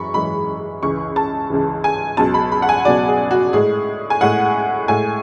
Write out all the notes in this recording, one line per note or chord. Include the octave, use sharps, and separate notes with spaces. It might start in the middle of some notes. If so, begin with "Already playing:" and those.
Already playing: F#2 E3 G#3 B5 C#6
F#2 E3 G#3 B5
C#2 C#3 E3 C#6
A5
C#2 C#3 E3
G#5
C#2 B2 F#3 A5
B5
B5
F#5
G#5
C#2 B2 F#3 D5
G#4
F#4
A2 G#3 G#4
G#5
A2 G#3 F#5
A2 G#3 G#5